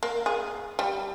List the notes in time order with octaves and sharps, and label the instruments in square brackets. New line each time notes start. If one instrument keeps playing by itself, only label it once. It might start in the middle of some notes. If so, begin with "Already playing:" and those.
[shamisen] A#3
G#4
G3